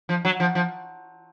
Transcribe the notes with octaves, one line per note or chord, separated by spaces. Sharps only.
F3
F#3
F3
F3